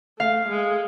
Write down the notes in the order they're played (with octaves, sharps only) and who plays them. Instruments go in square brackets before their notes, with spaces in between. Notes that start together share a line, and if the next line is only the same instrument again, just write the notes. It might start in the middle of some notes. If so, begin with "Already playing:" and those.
[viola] A3 [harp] F5
[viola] G#3